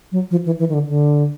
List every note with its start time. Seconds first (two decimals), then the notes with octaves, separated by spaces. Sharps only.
0.12 F#3
0.31 F3
0.46 E3
0.59 E3
0.69 D#3
0.74 D3
0.89 D3